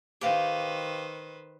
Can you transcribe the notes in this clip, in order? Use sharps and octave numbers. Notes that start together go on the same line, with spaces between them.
D#3 G4 B4 C5 F5